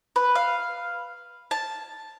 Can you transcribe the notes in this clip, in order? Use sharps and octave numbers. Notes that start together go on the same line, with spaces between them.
B4
F5
A5